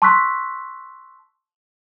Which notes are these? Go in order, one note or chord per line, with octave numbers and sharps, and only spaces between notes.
A5 C6 C#6 E6 F#6 B6